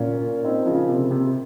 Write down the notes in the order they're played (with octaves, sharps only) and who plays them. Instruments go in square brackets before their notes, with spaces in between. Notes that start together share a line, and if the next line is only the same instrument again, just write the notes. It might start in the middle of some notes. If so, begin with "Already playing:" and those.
Already playing: [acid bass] A#2 [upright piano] C#4 F4
[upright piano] C4 D#4
C#3 F3
C3
C3